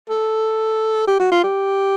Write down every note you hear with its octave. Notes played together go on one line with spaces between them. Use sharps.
A4
G4
F#4
F4
G4